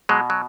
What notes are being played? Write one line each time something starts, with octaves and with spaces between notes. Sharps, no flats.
B2 F#3 G#3
F#3